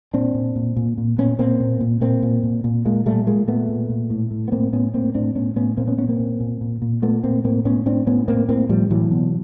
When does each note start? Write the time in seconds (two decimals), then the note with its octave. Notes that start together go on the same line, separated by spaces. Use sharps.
0.14 A#2 C4 D4
0.35 A#2
0.56 A#2
0.76 A#2
0.98 A#2
1.18 A#2 B3 C#4
1.39 A#2 A#3 C4
1.60 A#2
1.81 A#2
2.01 A#2 A#3 C4
2.22 A#2
2.43 A#2
2.64 A#2
2.85 A#2 G#3 A#3
3.06 A#2 G3 A3
3.27 A#2 G#3 A#3
3.48 A#2 A3 B3
3.69 A#2
3.89 A#2
4.10 A2
4.31 A2
4.48 B3
4.52 A2 A#3 C4
4.73 A2 B3 C#4
4.94 A2 A#3 C4
5.15 A2 C4 D4
5.35 A2 B3 C#4
5.56 A2 B3 C#4
5.77 A#2 A#3 C4
5.87 B3 C#4
5.98 A#2 B3 C#4
6.08 A#3 C4
6.19 A#2
6.40 A#2
6.61 A#2
6.82 A#2
7.02 A#2 A3 B3
7.24 A#2 A#3 C4
7.44 A2 A#3 C4
7.65 A2 B3 C#4
7.86 A2 C4 D4
8.07 A2 B3 C#4
8.28 A2 A#3 C4
8.49 A2 A#3 C4
8.69 A2 F3 G3
8.90 A2 E3 F#3
9.11 B2